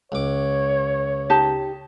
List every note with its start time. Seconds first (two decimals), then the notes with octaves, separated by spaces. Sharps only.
0.12 C#2 C#5 D6
1.30 D#4 G4 A5